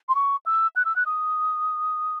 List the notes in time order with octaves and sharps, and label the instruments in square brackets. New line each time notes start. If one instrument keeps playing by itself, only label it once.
[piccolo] C6
C#6
E6
F#6
E6
F#6
D#6